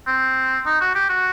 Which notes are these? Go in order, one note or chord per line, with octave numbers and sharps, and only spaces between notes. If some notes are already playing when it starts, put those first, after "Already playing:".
C4
D#4
F#4
G4
F#4